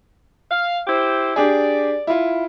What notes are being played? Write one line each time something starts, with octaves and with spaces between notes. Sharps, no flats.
F5
E4 G4 C5
D4 G4 G#4 D5
E4 F4